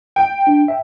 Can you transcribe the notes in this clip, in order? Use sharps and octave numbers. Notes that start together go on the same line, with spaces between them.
G5
D4
E5 G5